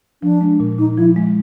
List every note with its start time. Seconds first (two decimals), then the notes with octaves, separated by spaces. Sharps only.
0.22 F3 D4
0.41 G#3
0.60 A#2
0.79 A#2 D#4
0.97 F3 E4
1.16 G#3